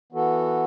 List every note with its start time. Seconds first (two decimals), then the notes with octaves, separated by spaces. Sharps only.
0.12 E3 B3 F#4 A4